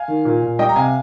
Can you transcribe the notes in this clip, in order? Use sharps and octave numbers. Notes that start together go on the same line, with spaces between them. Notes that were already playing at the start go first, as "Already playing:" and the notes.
Already playing: F5 G#5
D#3
A#2
A#2
G3 D#5 G5
A#5
C3 F5 G#5